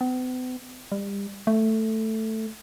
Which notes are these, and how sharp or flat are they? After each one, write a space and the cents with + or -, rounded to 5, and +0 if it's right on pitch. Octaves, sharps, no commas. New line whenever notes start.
B3 +45
G3 +30
A3 +5